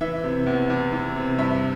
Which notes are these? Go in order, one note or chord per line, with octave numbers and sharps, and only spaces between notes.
E3 E5
C3
E2
E2
E3
C3
G2 E5